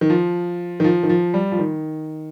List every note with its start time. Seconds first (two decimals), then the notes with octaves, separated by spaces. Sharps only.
0.01 D#3
0.10 F3
0.80 D#3
0.84 F3
1.03 D#3
1.09 F3
1.34 G3
1.52 F3
1.59 D#3